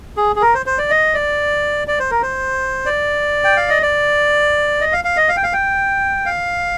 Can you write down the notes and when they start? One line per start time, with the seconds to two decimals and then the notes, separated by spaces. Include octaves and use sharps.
0.17 G#4
0.36 G#4
0.42 A#4
0.54 C5
0.66 C5
0.78 D5
0.90 D#5
1.14 D5
1.88 D5
2.00 C5
2.11 A#4
2.22 C5
2.86 D5
3.44 G5
3.57 F5
3.69 D#5
3.82 D5
4.81 D#5
4.93 F5
5.05 F5
5.17 D#5
5.29 F5
5.37 G5
5.44 F5
5.53 G5
6.26 F5